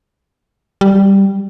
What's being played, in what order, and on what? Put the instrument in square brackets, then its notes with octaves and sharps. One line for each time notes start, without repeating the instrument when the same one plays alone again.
[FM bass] G3